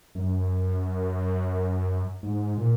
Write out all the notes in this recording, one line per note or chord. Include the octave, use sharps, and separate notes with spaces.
F#2
G#2
A#2